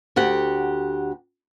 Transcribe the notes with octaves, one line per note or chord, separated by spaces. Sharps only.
D2 G4 F#5